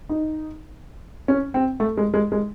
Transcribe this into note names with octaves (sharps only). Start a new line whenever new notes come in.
D#4
C#4
C4
A3
G#3
G#3
G#3